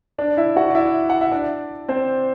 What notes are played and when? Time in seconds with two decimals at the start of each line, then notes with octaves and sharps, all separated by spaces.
0.18 D4 D5
0.37 E4 E5
0.56 F#4 F#5
0.70 D5
0.75 E4 E5
1.10 F#5
1.21 E5
1.32 D4 D5
1.88 C4 C5